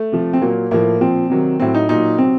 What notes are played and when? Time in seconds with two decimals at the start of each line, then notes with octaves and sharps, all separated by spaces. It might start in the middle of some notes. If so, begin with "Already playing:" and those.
Already playing: A3
0.12 C3 F3
0.33 C4
0.42 A#2 F#3 A#3
0.71 A2 F3 A#3
1.01 A#2 F3 C4
1.30 C3 D#3 F#3
1.59 A2 F#3 C4
1.74 D#4
1.89 A#2 F#3 D#4
2.18 C3 F#3 C4